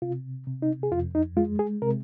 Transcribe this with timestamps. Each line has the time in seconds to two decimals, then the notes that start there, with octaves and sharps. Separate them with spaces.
0.02 C3 F4
0.47 C3
0.62 D#4
0.83 G#4
0.92 F2 F4
1.15 D#4
1.37 G#3 F4
1.59 G#4
1.82 C3 A#4